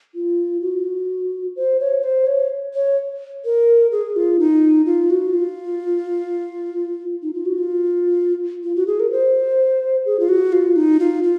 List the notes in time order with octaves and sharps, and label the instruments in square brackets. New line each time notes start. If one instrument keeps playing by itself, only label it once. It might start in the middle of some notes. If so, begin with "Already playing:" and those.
[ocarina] F4
F#4
C5
C#5
C5
C#5
C#5
A#4
G#4
F4
D#4
F4
F#4
F4
D#4
F4
F#4
F4
F4
F#4
G#4
A#4
C5
G#4
F4
F#4
F4
D#4
F4
F4